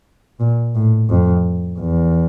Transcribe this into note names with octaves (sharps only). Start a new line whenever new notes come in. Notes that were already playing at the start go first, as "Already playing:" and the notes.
A#2
A2
F2
E2